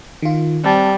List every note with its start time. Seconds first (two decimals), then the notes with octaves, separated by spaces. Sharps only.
0.22 D#3 F4
0.65 G3 C4 A5